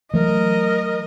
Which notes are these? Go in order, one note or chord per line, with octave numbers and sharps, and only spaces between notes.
E3 F#3 A3 A#4 D#5